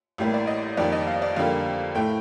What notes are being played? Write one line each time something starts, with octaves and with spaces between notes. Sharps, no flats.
A1 A2 G3 A#3 G4
D5
D#5
F2 D#3 G3 A#3 D5
D#5
F5
D5
F2 D3 G3 A#3 F5
A2 A3 G5